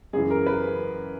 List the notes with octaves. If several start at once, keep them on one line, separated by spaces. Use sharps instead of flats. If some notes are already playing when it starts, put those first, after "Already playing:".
F#2 C#3 E3 G#4
A#4
B4